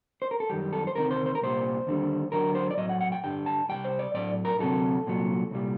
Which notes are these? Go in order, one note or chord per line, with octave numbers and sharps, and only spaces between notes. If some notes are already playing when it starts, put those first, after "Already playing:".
C5
A#4
A4
F#2 D#3 G3 G4
A4
C5
D2 C3 D#3 A#4
C5
C5
A#4
C2 A#2 G3 C5
D#2 D3 G3
D2 D3 F#3 A#4
C5
D5
A2 F#3 D#5
F#5
F#5
G5
G2 D3 G3 G5
A5
C2 A#2 G3 G5
C5
D5
A2 F#3 D5
A#4
D2 C3 F#3 A4
C2 A#2 F#3
C2 A#2 G3